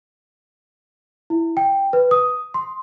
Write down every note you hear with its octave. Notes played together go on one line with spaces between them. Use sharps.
E4
G5
B4
D#6
C6